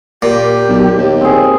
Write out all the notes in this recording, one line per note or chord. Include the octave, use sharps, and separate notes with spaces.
A#2 G4
B1
D#2
C4 G#4